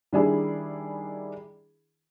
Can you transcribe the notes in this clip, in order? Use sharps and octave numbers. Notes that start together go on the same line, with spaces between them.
D#3 G3 D4 E4 G#4